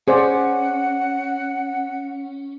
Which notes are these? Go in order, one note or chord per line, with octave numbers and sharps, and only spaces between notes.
C#4 G#4 C5 D5 F#5